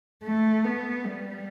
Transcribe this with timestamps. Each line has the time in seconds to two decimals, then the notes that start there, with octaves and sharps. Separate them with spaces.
0.24 A3
0.65 B3
1.05 G3